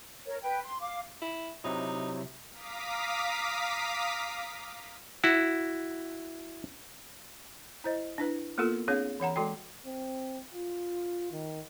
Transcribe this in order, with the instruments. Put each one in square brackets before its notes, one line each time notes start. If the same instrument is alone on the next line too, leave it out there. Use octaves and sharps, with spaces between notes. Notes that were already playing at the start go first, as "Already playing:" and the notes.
[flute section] A#4 C#5
B4 G5
C6
F5 D6
[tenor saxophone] E4
[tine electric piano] C3 F#3 E4 [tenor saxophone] D#4
[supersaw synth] F5 A#5 D6 D#6 B6
[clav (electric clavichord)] E4 F#4
[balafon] E4 C5 D#5
D4 E4 B4
A#3 B3 F4 A4 A#4
C4 D4 G#4 C#5 F5
E3 C#5 F#5 A#5
G#3 F#4 A4 G5
[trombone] C4
F4
D#3